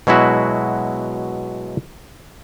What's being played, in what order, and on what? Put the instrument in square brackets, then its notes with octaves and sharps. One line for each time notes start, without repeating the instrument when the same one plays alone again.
[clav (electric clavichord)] B2 F#3 G#3 E4 F#4 E5